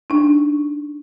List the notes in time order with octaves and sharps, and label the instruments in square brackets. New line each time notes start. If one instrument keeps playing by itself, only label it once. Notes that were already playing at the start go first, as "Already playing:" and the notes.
[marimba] D4 D#4